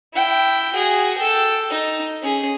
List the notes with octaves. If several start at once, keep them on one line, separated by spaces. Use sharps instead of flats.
E4 G5
F#4 G#4
A4 G5
D#4
C#4 G#4